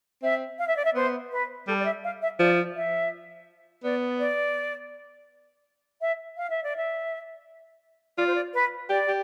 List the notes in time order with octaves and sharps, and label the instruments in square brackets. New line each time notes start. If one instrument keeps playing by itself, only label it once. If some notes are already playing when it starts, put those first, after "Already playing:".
[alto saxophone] C4 [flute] E5
[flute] F5
E5
D5
E5
[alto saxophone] B3 [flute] C5
[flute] B4
[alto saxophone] G3 [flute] A4
[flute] D5
E5
F5
E5
[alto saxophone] F3 [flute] D5
[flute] E5
[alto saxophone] B3 [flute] D5
[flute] D5
E5
F5
E5
D5
E5
[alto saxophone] F4 [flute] D5
[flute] C5
D5
B4
[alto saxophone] G4 [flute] D5
[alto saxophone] G4